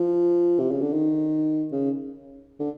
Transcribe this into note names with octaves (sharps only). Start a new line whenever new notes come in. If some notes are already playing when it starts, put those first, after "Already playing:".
Already playing: F3
C3
C#3
D3
D#3
C#3
D3